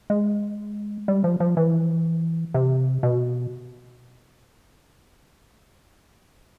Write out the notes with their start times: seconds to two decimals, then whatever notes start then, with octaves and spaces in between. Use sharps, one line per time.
0.10 G#3
1.08 G3
1.24 F3
1.40 F3
1.57 E3
2.54 C3
3.03 B2